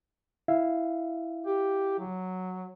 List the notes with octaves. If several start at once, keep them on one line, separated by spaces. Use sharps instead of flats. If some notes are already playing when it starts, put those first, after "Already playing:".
E4 E5 F5
G4
F#3